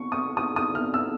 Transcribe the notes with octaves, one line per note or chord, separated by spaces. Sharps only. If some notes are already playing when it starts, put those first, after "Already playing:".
Already playing: C#6
D#6
D#6
D#6
F6
E6